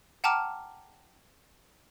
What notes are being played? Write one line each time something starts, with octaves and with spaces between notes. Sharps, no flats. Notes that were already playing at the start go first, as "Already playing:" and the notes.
F#5 G5 A5 A#5 D6 F6